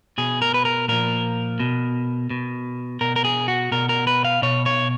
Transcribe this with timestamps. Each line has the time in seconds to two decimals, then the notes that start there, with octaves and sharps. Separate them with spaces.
0.18 B2 G#4
0.42 A#4
0.54 B4
0.65 A#4
0.89 A#2 F3 A#4
1.60 B2
2.30 B2
3.01 B2 A#4
3.16 A#4
3.25 G#4
3.48 F#4
3.72 B2 A#4
3.89 A#4
4.07 B4
4.25 F5
4.42 B2 C#5
4.66 C#5